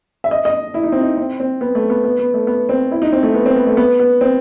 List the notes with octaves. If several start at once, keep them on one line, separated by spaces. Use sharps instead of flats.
E5
D#5
D#5
E4
D#4
C4
D#4
C4
C4
B3
A3
B3
B3
B3
A3
B3
C4
E4
D#4
C4
A3
B3
C4
B3
A3
B3
B3
C4